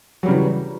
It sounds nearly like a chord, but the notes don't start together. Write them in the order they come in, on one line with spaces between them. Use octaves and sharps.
F#3 G3 C#3 E3